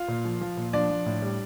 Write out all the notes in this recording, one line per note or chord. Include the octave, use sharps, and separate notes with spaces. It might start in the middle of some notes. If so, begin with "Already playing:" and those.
Already playing: F4 F5
A#2
F3
F3
A#2
F3 D4 D5
F3
A2
G3